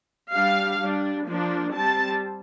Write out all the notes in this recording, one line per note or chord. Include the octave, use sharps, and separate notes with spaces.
G3 D4 F5
G3 D4
F3 A#3 D4
G3 C4 A5